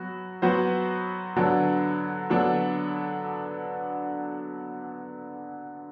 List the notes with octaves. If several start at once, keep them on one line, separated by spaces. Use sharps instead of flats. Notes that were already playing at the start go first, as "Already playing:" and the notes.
Already playing: F#3 B3 F#4
F#3 B3 F#4 C5
D3 F#3 B3 D4 A4
D3 F#3 B3 D4 A4